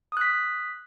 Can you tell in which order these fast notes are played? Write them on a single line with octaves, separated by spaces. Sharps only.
D#6 F#6 B6